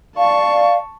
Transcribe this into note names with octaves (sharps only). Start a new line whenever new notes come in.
D5 F5 A5 C#6